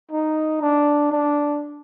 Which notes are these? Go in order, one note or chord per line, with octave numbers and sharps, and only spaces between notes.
D#4
D4
D4